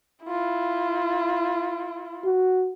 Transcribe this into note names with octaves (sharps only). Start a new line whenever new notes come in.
E4 F4
F#4